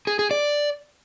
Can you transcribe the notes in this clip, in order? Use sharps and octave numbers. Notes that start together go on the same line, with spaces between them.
G#4
G#4
D5